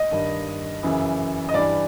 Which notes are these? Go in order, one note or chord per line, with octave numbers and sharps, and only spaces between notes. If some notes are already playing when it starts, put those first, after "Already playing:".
Already playing: D#5
G2 D#3
F#2 C#3 E3
D#5
G2 E3 D5